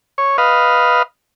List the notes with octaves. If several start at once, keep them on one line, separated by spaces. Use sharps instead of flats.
C#5
B4 D#5 F5